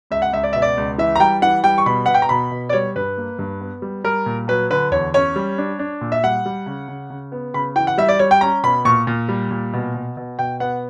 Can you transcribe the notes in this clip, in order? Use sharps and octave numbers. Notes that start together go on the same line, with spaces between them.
C#2 E5
F#5
C#2 E5
D5
B2 E5
D5
C#2
E3 E5
A#5
G3 G5
E3 F#5
G3 G5
C#6
B2 B5
B2 F#5
G5
A#5
B2 B5
B2
D5
G3 C#5
G2 B4
A#3
G2
B3
G3
G3 A#4
A#2
F#3 B4
D3 B4
E2 C#5
C#4 C#5
G3
D4
D4
A#2
E5
G3 F#5
G3
C#3
C#3
C#3
B3
C#3 B5
E3 G5
F#5
G3 E5
D5
G3 C#5
G5
C#4 A#5
B2 B5
A#2 C#6
A#2
G3
A#2
B2
B2
B2
B2 G5
B3 F#5